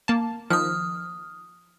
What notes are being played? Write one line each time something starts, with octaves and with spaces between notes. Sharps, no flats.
A#3 A5
D#3 F3 D#6 F6